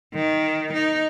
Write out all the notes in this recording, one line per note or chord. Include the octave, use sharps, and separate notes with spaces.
D#3
D#4